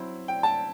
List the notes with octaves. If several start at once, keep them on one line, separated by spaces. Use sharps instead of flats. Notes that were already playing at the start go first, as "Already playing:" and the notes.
Already playing: F#3 C4 E4
G5
A5